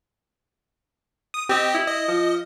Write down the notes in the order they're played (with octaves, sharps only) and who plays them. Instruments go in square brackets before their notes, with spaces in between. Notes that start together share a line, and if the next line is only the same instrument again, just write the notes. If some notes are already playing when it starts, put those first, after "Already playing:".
[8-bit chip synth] D#6
[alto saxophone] C4 [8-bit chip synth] G4 D#5
[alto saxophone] E4
[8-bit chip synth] D#5
[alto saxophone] F3